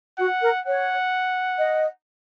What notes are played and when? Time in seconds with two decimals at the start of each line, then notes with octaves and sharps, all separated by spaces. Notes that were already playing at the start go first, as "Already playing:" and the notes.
0.19 F#4 F#5
0.42 A#4
0.66 C#5 F#5
1.58 D#5